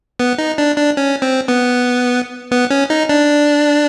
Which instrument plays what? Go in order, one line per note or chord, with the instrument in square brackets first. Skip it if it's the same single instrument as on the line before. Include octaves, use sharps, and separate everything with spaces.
[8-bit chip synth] B3
D#4
D4
D4
C#4
C4
B3
B3
C#4
D#4
D4